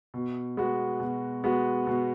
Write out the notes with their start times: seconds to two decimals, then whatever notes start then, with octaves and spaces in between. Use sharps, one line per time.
0.14 B2
0.57 G#3 B3 F#4
1.00 B2
1.44 G#3 B3 F#4
1.87 B2